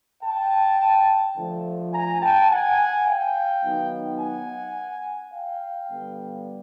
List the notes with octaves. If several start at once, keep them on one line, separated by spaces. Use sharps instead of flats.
G5 A5
D3 F3 A3
G#5 A#5
G5 A5
F#5 G#5
F5 G5
D#3 F#3 B3 D#4
F#5 G#5
F5 G5
D3 G3 B3